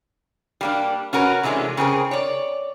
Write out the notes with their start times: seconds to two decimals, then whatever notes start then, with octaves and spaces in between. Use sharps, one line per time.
0.61 G3 A#3 D4
1.13 C#4 F#4 A#4 B4
1.43 C3 E3 G#3 A3 C#4 D4
1.77 C#3 C4 G#4 A#4
2.11 C#5 D5